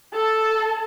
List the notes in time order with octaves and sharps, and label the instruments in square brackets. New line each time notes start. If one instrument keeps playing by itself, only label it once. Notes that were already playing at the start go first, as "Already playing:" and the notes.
[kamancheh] A4 A5